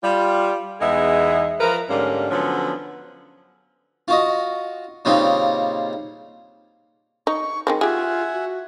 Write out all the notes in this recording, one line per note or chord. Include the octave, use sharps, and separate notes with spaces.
G3 F4
E2 G#3 B3 D#4 G#4 E5
F3 A#4 B4
G#2 D3 G3 A#3 C#4
D3 F3 F#3 B3 C#4
F4 F#4 D#5
A#2 C#3 G3 C4 D#4 F4
D#4 C#6
D#3 G#3 C4
F4 G4 G#4 E5 F#5 G#5
F#4